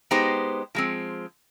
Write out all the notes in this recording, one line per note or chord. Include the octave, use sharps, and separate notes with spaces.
G#3 B3 D#4 G4 C5
F3 G#3 C4